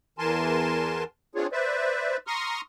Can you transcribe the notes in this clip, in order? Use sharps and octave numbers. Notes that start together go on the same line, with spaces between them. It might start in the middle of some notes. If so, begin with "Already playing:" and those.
E2 E3 A#4 G#5 A5 C6
C4 D4 F4 G#4 C#5
B4 C5 D5 E5
A#5 C6 C#6 D#6 F6